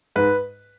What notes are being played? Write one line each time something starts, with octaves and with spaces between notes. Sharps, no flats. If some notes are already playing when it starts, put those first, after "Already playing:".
G#2 B4